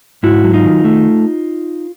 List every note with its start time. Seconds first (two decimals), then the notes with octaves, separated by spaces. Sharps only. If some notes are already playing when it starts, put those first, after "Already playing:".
0.23 G#2 E4 F#4
0.44 F#3
0.53 D#4 F4
0.64 D#3
0.85 A3